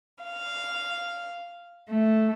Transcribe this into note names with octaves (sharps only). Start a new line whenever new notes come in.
F5
A3